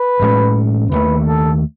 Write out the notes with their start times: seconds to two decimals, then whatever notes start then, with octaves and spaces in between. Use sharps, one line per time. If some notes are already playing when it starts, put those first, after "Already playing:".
Already playing: B4
0.20 A1 A2 G#3 C#4
0.91 D#2 D#3 A3 B4
1.27 A4